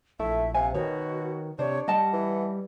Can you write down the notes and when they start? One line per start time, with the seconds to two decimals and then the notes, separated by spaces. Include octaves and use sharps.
0.19 A#1 A3 E4 E5
0.54 C3 F5 G#5
0.74 B2 D#3 F#4 C#5
1.59 C3 D4 C5 C#5
1.88 G3 D#5 F#5 A5
2.13 E3